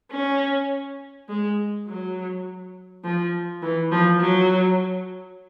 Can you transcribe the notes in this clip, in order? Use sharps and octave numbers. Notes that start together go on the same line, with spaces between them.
C#4
G#3
F#3
F3
E3
F3
F#3